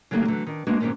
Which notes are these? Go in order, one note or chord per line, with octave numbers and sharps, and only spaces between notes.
C#3 F#3 A3 A#3 D#4 G4
D3 E3 F#3 A3
D#3 D4
G#3 A#3 B3 D4 F#4
F2 G#2 B2 D#3 A#3 C#4